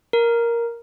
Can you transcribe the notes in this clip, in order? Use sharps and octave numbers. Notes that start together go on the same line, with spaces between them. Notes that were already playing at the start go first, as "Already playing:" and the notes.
A#4